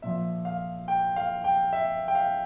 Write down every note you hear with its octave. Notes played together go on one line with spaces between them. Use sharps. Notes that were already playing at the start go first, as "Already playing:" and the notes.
A#2 F3 E5
F5
G5
F5
G5
E5
G5
F5